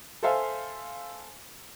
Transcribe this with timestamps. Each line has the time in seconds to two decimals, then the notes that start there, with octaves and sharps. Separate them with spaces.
0.23 A4 C5 E5 F5 G#5